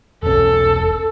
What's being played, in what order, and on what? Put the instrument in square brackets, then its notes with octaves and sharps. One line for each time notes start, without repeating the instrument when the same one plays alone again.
[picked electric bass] E1 B1 C#4 [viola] A4